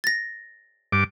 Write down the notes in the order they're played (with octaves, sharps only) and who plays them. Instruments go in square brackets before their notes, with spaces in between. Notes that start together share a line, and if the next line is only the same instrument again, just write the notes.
[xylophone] A6 A#6
[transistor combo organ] G2 D6